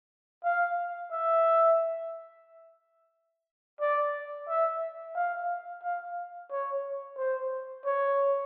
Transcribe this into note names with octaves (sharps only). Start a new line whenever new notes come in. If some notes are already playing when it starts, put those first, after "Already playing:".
F5
E5
D5
E5
F5
F5
C#5
C5
C#5